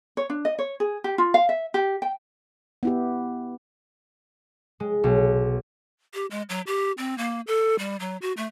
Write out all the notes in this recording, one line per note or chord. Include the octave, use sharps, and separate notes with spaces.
C#5
D4
D#5
C#5
G#4
G4
F4
F5
E5
G4
G5
B3 E4 G4
G#3
B1
G4
G#3
F#3
G4
C4
A#3
A4
G3
F#3
F#4
A3